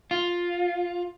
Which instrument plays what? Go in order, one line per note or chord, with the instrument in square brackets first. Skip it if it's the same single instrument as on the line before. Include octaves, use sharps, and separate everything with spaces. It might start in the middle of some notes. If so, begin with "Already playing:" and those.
[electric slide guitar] F4